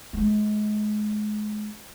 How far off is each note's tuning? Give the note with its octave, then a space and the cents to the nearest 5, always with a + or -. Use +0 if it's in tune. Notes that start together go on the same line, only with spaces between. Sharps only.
G#3 +30